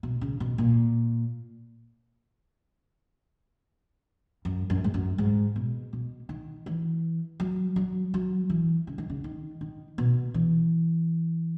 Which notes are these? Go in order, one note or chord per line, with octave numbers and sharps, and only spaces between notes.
B2
C#3
B2
A#2
F#2
F#2
G#2
F#2
G#2
B2
B2
D#3
E3
F#3
F#3
F#3
E3
C#3
D#3
C#3
D#3
D#3
B2
E3